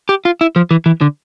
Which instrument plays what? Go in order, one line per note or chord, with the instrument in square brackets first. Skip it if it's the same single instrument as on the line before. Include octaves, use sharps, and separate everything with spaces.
[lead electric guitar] G4
F4
E4
F3
E3
E3
D3